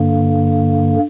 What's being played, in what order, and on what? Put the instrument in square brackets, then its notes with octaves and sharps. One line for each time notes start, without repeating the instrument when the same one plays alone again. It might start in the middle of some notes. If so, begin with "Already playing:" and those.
Already playing: [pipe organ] G2 D3 A#3